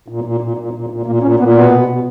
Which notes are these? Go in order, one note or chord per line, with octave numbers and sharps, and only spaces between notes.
A#2
A#2
A#2
A#2
A#2
A#2
A#2 A#3
A#2 C#4
A#2 B3
B2 B3
B2
B2